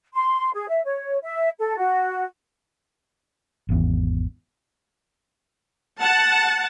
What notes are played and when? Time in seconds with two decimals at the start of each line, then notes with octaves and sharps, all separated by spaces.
0.15 C6
0.54 G#4
0.69 E5
0.85 C#5
1.23 E5
1.59 A4
1.77 F#4
3.69 G#1 E2
6.00 F#5 A5